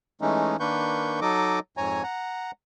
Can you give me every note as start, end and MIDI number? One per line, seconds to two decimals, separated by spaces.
0.21 0.57 52
0.21 0.57 56
0.21 0.57 57
0.21 0.57 61
0.21 0.57 63
0.60 1.20 51
0.60 1.20 58
0.60 1.20 62
0.60 1.20 71
0.60 1.20 85
0.60 1.20 91
1.21 1.59 54
1.21 1.59 63
1.21 1.59 69
1.21 1.59 75
1.21 1.59 86
1.77 2.03 41
1.77 2.03 44
1.77 2.03 73
1.77 2.03 80
1.77 2.03 82
2.03 2.51 78
2.03 2.51 82